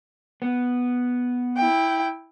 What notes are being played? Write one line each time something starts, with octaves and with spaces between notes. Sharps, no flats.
B3
E4 G5